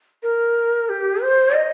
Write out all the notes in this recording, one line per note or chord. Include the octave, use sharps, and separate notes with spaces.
A#4
G4
C5
D#5